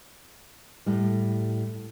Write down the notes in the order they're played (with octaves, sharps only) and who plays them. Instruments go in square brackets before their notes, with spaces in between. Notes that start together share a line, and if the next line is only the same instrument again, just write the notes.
[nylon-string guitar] A2 G3